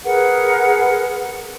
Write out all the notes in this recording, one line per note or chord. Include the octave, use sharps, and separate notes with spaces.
G#4 A#4 B4 F#5